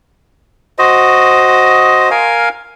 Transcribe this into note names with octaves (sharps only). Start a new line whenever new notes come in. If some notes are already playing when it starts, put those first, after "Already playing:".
F#4 C5 D#5
A#4 F5 G#5